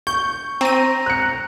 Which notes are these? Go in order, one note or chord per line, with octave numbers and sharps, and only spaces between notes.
C#6 G6
C4 A#5 D#7
F#6 C#7